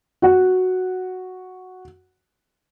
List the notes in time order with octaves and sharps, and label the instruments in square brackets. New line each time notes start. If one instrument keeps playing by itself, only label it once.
[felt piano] F#4 F#5